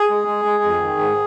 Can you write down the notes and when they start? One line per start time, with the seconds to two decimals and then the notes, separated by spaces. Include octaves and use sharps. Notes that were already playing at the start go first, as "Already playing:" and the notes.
Already playing: G#4
0.10 G#3
0.28 G#3
0.45 G#3
0.64 F2
0.81 D#3
0.99 G#2